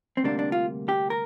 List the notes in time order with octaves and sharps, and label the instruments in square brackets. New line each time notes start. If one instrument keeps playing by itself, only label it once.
[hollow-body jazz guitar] C4
D2 C3 G3 A#3 D4
D4
F4
G4
A#4